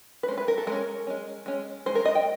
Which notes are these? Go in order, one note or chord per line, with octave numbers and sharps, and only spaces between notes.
B4
G#3 C#4 C5
B4
A#4
A4
G#3 C#4 A#4
G#3 C#4
G#3 C#4
D#3 G#3 C5
A#4
D#5
G5